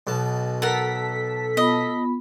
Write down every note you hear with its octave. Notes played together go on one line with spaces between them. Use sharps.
B1 B2 A5
A4 A#4 F#5 B6
B3 F4 D#5 B5